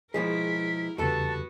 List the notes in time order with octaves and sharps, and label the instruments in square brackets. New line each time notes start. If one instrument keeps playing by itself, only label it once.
[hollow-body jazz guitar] B2 F3 G#3 [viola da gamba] E4 A#4 [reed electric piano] G#4 [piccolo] B6
[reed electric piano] E2 C#3 [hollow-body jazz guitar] G3 A4 [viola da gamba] B3 F#4 B4 [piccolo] A5